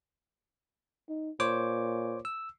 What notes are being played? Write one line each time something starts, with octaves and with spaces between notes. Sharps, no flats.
D#4
A#2 C5 C#5 D6
E6